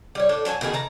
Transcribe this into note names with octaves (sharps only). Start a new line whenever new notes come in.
G3 C#5
A2 D4 A4
F#3 A4 B4 G#5
B2 D#3 A3 G#4
E3 A5 A#5